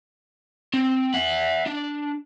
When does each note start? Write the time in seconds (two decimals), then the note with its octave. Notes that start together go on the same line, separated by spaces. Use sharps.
0.74 C4
1.14 E5 F#5
1.66 D4